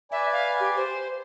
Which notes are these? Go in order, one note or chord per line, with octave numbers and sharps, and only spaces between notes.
B4 D5 E5 G#5
F5
G4
C5